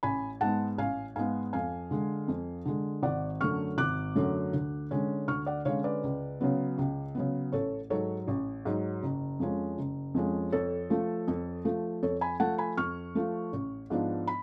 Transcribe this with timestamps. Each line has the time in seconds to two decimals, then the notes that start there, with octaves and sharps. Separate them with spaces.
0.03 A1 G#5 B5
0.41 G#2 G#3 B3 F#5 A5
0.78 A1 F5 G#5
1.16 G#2 G#3 B3 F5 G#5
1.53 F2 F5 G#5
1.91 D3 G#3
2.28 F2
2.65 D3 G#3
3.03 G#1 D5 F#5
3.41 F#2 D3 F#3 A3 C#6 F6
3.78 G#1 D6 F#6
4.15 F#2 D3 F#3 A3
4.53 D2
4.91 D3 G#3 C#4
5.28 D2 C#6 F6
5.46 D5 F#5
5.65 D3 G#3 C#4 C#5 F5
5.84 B4 D5
6.03 C#2
6.41 C#3 F#3 B3
6.78 C#2
7.15 C#3 F#3 B3
7.52 A1 A4 C#5
7.90 G#2 F#3 A4 C#5
8.28 A1
8.65 G#2 F#3
9.03 F#1
9.40 F2 F3 G#3 C#4
9.78 F#1
10.15 F2 F3 G#3 C#4
10.52 F2 A4 C#5
10.90 F3 A3
11.28 F2
11.65 F3 A3
12.03 F2 A4 C#5
12.21 G#5 B5
12.40 F3 A3 F#5 A5
12.58 G#5 B5
12.77 F2 C#6 F6
13.15 F3 A3
13.53 A1
13.90 G#2 F3 B3 D4
14.28 B5